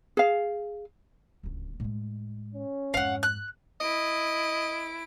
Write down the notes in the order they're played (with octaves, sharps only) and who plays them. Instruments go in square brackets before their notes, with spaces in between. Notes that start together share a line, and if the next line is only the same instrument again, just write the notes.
[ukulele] G#4 F5
[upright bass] D1 C#2
A2 G#3
[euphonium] C#4
[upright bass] F2 G#2 [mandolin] F5 F#5
[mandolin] F#6
[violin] E4 D7 [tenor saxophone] D#5